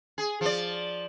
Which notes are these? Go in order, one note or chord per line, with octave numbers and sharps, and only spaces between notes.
G#4
F3 D5